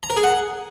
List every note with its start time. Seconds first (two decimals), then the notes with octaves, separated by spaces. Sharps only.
0.03 A#5
0.10 A#4
0.17 G#4
0.23 F#5